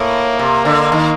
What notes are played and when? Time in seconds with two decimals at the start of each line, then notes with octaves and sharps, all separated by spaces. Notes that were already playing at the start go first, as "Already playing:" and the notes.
Already playing: A2 A#3
0.39 C3
0.65 D3
0.92 D#3